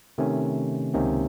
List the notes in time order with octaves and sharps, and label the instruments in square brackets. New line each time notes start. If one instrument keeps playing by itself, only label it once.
[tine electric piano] C3 D#3 A3 C#4
C#2 C3 D#3 A#3 C#4